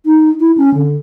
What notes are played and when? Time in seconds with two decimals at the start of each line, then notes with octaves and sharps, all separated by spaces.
0.06 D#4
0.40 E4
0.57 C#4
0.74 D3